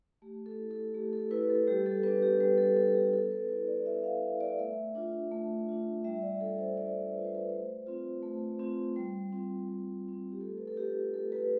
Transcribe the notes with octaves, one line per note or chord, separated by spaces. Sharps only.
A3 G4
A4
E4
A4
A3 G4
A4
E4 B4
A4
G3 G4
A4
B3 D4 B4
G4
G3 B4
A4
B3 D4 A4
A4
G4
B3 A4
B4
E4 B4
D5
B3 E5
E5
F5
E4 E5
D5
A3 E5
D4 F4
A3
D4 F4
G3 E5
D5
D4 F4 A4
C5
G3 D5
D4 F4 B4
C5
B4
A3 C5
C4 F4
A3
C4 F4
G3
C4 F4
G3
C4 F4
G4
A3 A4
B4
A4
D4 F4 G4
A3 A4
B4